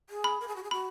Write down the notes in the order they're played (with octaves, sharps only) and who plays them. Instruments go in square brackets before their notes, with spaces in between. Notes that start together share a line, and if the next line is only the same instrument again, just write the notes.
[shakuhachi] G#4
[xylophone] B5
[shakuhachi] A#4
G#4
F#4
G#4
[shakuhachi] F#4 [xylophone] B5